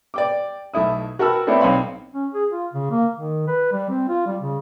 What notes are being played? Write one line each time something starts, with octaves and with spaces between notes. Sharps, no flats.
D5 G5 D6
B1 A3 E4 D#6
F#4 A#4 G5 A5 B5 E6
A3 B3 C4 D4 E4 C#5
B1 C4 C#5 F5 B5 C6
C#4
G#4
F4
C#3
A#3
D#3
B4
G3
C4
F4
G3
C#3